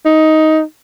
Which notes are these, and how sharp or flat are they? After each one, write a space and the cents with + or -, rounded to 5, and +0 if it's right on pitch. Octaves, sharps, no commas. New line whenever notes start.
D#4 +10